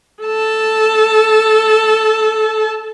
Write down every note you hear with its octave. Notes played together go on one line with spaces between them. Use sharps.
A4 A5